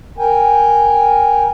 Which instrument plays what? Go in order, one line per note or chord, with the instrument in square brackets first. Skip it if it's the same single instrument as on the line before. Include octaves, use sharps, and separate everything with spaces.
[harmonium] A#4 G5 G#5